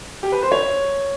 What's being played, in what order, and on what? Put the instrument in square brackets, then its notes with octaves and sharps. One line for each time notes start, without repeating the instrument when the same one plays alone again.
[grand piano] G4
B4
C5
C#5